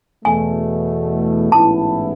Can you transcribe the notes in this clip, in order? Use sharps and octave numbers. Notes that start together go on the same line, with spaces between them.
E2 B2 A3 G#5
A1 G#2 E3 B3 E4 A5